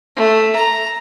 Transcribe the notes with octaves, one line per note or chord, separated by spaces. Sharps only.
A3
A#5